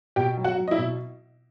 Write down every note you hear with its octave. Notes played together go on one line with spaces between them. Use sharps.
B2 G4 G5
F#3
F#4 F#5
F#3
D#5
E4 E5
B2